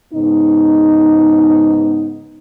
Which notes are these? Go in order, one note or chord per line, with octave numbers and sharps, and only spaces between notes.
G#2 C#3 B3 D#4